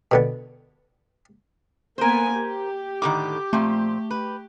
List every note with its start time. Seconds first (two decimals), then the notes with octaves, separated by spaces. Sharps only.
0.11 B2 D3 B3
1.98 A#3 B3 A#4 C5 G#5
2.36 G4
3.02 A2 D3 D#3 D6
3.53 A#2 F3 A3 C4
4.11 B4